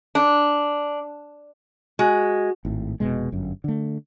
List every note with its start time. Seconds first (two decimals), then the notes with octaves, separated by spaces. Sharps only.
0.15 D4
1.99 G#3 F#4
2.65 G#1 A2
3.00 F1 B2 G#3
3.32 G1 F#2
3.64 D3 A3